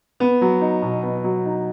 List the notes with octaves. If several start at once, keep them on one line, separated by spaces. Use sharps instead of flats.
B3
F#3
D#4
B2
B3
F#3
D#4